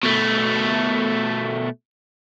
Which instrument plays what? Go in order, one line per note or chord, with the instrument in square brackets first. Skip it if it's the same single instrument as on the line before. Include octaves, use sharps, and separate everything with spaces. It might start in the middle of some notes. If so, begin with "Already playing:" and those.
[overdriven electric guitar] B2 A3